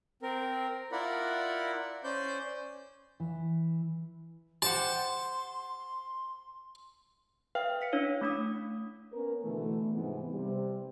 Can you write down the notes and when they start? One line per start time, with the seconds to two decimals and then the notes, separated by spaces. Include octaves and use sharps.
0.23 C4 A#4
0.92 E4 F4 A#4 D5 F#5 B5
2.04 C#4 C5 D5 G6
3.20 E3
4.62 G4 C5 F#5 A5 C6
7.55 B4 E5 F5 G5 F6
7.81 F5 B6 C#7
7.93 C#4 D4 E4 C#5
8.21 A3 D4 D#6
9.13 B3 C#4 A#4
9.44 B2 D3 E3 A3
9.93 G#2 C3 E3 F3 B3
10.33 C3 G3